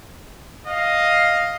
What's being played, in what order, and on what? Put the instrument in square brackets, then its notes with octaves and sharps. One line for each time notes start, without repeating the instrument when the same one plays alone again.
[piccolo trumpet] D#5 [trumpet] F5